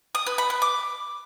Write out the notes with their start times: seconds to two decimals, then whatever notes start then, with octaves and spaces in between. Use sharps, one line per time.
0.15 D#6
0.26 B4
0.38 B5
0.50 B4
0.62 D6